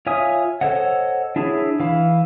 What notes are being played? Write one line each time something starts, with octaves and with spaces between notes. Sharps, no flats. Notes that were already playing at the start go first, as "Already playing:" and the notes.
F4 C#5 E5 G#5 D#6
A4 C5 C#5 D#5 F#5
D4 E4 G#4 C#5
E3 F5 B5